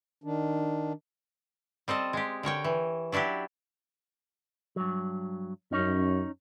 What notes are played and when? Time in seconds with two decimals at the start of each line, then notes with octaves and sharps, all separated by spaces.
0.24 D#3 D4
1.88 G3 C4 A4 D#5
2.13 G#3 G4
2.43 D3 A#4 C#5 G5
2.64 E3
3.12 F#3 D4 E4 F#4 G4
4.76 G2 F#3
5.72 F#2 C#4 D#4 C#5